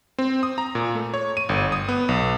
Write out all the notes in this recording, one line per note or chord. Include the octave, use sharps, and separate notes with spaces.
C4
D#6
A#5
A#2
A3
C#5
D#7
G1
D#6
B3
B1